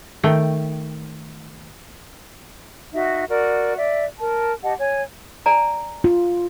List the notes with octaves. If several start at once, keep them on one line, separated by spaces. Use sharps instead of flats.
D#3 A3 G5
D#4 F#4 E5
F#4 A#4 D5
D5 E5
A#4 A5
G4 D#5 F#5 A5
C#5 G#5
D5 G#5 A#5
F4